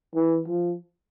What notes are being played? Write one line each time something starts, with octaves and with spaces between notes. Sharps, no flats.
E3
F3